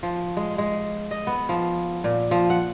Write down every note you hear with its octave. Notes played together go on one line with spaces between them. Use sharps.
F3
G#3
G#3
D#5
B3
F3
A#2
F3
F#5